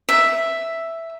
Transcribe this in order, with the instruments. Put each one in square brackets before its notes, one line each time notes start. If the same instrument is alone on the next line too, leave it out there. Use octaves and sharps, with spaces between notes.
[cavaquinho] E5